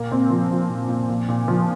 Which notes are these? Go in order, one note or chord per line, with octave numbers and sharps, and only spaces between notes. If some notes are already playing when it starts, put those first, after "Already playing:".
Already playing: A#2 A#3
A#2 C4
F3
F3
A#2
A#2
A#2
A#2
F3